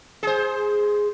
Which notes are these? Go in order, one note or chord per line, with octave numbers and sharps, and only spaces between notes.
G#4 C5